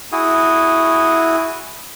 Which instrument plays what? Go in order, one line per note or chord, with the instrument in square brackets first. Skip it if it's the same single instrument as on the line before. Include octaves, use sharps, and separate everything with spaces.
[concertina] E4 F#4 G#4 D#6